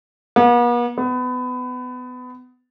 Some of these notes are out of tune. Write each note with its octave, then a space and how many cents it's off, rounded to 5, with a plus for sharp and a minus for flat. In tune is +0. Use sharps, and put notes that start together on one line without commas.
B3 -45
B3 +25